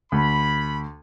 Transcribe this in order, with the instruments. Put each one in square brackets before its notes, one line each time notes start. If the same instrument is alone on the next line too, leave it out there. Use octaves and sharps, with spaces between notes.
[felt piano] D2 [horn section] B5